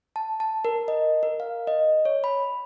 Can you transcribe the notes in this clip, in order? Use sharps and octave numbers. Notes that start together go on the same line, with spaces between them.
A5
A5
A#4
D#5
A#4
F5
D#5
C#5
B5